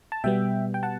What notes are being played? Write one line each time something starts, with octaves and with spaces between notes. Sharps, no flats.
A5
B2 G3 B3 E5 G5
G5
F#5 A5